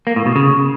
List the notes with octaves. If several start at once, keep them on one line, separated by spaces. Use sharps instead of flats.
A#3
A2
B2
C#3